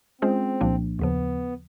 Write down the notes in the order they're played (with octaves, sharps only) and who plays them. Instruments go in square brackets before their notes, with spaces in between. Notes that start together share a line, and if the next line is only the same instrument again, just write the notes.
[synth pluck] G#3 C#4 F4 G#4 C5 [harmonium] C4
[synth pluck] C2 A#2 F3 A#3 D4
[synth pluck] D#2 C#3 F3 [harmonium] B3